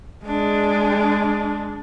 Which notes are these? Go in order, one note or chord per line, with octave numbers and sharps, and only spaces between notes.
G#3 D4